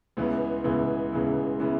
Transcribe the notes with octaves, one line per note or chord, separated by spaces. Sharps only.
C#2 C#3 E3 B3
C#2 C#3 E3 B3
C#2 C#3 E3 B3
C#3 E3 B3